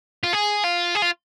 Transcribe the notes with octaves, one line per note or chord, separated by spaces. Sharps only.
F4
G#4
F4
G#4
F4